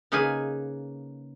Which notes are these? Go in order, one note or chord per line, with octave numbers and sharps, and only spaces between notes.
C#3 A#3 D#4 G#4 B4 G#5